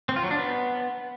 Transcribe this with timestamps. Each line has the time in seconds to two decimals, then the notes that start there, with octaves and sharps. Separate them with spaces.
0.09 C4
0.16 F4
0.24 F#3
0.31 D4
0.38 B3